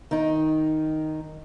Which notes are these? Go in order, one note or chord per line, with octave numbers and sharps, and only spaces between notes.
D#3 D#4